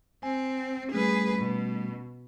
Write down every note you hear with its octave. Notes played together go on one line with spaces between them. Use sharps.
C4 G#5
G3 A3 C#4 G#4 B4
B2